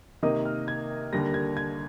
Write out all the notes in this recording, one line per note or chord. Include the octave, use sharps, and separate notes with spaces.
C3 D#3 A#3 D#4 D#6
F6
G#6
D#2 D3 G3 A#3 A#6
G#6
G#6